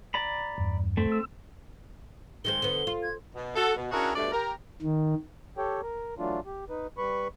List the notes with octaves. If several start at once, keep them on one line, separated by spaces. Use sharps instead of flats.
D5 A#5 B5
E2 G2
A3 C4
E6
D#3 G#3 C4 G7
D3 B3
F4
G#6
B2
F#4 A4
B2
C#4 D4 E4 F#4 G#4 A#4
D2 G2 B2 A3 D4 D5
G4 A#4
D#3
G4 A4 C#5 G5
A#4
E3 F#3 A3 D4 F4
G4
D#4 B4
G3 B4 B5 C#6